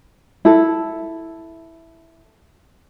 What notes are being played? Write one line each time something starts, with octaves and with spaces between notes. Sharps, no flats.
E4 A4